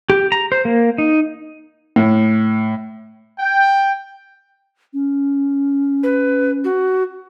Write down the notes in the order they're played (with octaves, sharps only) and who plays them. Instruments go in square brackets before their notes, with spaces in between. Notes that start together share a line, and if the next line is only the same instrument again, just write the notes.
[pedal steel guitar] G4
A#5
C5
A#3
D#4
[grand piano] A2
[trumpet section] G5
[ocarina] C#4
[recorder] B4
F#4